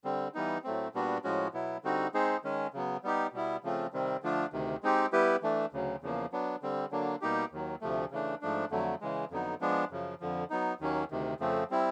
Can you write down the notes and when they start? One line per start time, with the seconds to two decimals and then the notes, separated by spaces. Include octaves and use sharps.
0.04 D3 G3 C4
0.34 E3 G3 B3 D#4
0.64 A2 F#3 A3 C4
0.94 A#2 G3 B3 D4 F#4
1.24 A2 F3 G#3 C#4 F#4
1.53 B2 F#3 B3 E4
1.84 D3 G3 C4 D#4 F#4
2.14 G#3 C4 D#4 G#4 C5
2.43 D#3 G#3 C#4
2.73 C#3 F#3 B3
3.03 G3 B3 D#4 G4
3.33 B2 G3 B3 E4
3.63 C#3 F3 A3 C4 F4
3.93 C3 D#3 G3 C4
4.23 D3 F3 A3 D4 F4
4.53 D2 C3 D#3
4.83 G#3 C4 D#4 G4
5.12 G3 B3 E4 G4 B4
5.42 E3 A3 D4
5.72 D2 C#3 F#3
6.02 E2 C#3 F3 A#3
6.32 F#3 B3 D4
6.62 D3 G3 C4
6.91 D3 F#3 A#3 D4
7.21 B2 G3 A#3 D#4 G4
7.52 D#2 D#3 F#3
7.81 D2 C3 F3 A3
8.11 C#3 E3 A3 D4
8.41 G#2 F3 A3 D4
8.71 F2 D3 F#3 A3
9.01 C#3 E3 G#3
9.31 F2 D3 F#3 B3 D#4
9.61 F3 G#3 B3 D4
9.91 F#2 C#3 F3
10.20 F2 D3 F3
10.50 F#3 B3 D#4
10.80 D#2 D#3 F#3 A#3 C#4
11.11 D2 C3 D#3
11.40 F2 C#3 F3 A3 C4
11.70 G3 C4 E4